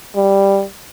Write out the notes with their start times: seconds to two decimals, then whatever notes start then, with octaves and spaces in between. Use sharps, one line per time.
0.16 G3